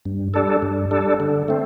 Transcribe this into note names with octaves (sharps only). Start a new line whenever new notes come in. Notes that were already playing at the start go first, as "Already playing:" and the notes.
G2
G3 D4 A4
G2
G3 D4 A4
D3
A3 C4